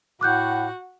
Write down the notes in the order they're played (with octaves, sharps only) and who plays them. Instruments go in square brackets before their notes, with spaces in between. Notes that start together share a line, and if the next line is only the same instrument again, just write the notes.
[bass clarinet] A2 [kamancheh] F#4 F#5 [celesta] D6 F#6 G6